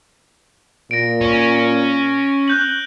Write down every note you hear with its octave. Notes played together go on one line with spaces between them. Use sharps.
A#2 A#6 D7
C#4
F#6 G6 F#7